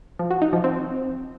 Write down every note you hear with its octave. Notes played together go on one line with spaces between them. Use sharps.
F3
F#4
D#4
F3
C4